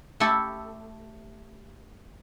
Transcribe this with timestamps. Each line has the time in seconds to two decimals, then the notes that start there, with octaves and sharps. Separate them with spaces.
0.20 A3 E4 G4 A4